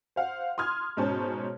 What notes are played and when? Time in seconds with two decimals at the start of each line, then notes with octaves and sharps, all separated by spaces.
0.16 C5 F5 F#5
0.58 C6 D#6 F6 G#6
0.97 G#2 B2 C#4 C5 A5